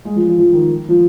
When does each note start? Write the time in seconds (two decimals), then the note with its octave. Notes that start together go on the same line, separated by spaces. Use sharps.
0.05 G#3
0.16 F3
0.27 F3
0.38 F3
0.53 D#3
0.89 F3